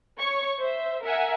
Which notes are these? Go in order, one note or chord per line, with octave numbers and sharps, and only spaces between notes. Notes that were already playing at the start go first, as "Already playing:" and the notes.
C#5 C#6
C5 E5
A#4 E5 F#5 G#5